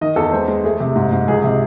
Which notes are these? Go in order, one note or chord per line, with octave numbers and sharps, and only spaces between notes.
D#3 D#5
E2 A4
G#3 C5
G#3
A3 G#4
C3
G#2
G#2
C#2 G#4
C3